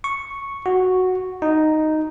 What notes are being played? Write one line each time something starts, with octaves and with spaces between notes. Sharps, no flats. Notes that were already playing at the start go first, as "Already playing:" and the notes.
C#6
F#4
D#4